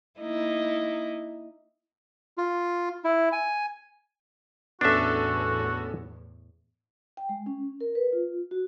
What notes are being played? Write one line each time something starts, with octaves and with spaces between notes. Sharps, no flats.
A#3 D#4 E4
F4
E4
G#5
E2 A2 B3 C#4 D4 F#4 A4 E5
G5
G#3
C#4
A#4
B4
F4
F#4